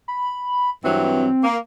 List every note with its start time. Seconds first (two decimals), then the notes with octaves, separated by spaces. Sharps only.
0.08 B5
0.84 G2 E3 F#3 C4
1.43 A#3